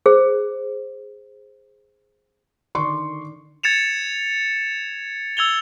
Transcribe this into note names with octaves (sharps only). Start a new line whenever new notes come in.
G#4 C5
D3 D#3 D5 C6 C#6
G#6 A6 C#7 E7 F7
E6 G#6 F7 G7